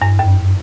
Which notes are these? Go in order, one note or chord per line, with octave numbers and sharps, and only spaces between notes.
G2
F#2